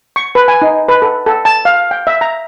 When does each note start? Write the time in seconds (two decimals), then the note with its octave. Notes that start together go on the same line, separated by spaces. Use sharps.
0.16 C#6
0.35 B4
0.48 G#5
0.62 D#4
0.89 B4
1.02 A4
1.26 A4
1.45 A5
1.65 F5
1.91 G5
2.07 E5
2.21 A#5